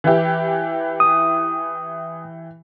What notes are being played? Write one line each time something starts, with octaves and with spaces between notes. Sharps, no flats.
E3 E4 G4
D#6